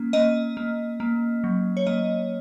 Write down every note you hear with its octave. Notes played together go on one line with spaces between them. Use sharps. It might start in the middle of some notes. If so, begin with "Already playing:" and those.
Already playing: A#3 C#4
A#3 D#5
A#3
A#3
F#3
C#5
A#3 D#5